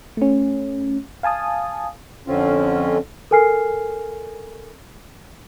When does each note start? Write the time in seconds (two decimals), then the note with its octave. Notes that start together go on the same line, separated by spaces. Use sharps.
0.17 A3 C#4
1.23 F5 G#5 A5 D#6
2.27 F2 D3 C4 C#4 F4
3.31 A4 A#4 G#5 F6 C7